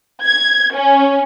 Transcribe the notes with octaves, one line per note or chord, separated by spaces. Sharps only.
G#6
C#4